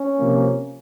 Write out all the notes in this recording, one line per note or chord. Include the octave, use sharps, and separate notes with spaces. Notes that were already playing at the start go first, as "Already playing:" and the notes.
Already playing: C#4
C3 F3 A#3